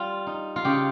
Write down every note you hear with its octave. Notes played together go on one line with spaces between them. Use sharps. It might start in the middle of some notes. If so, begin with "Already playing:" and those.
Already playing: G3 F4
D#4
F4
C#3 G4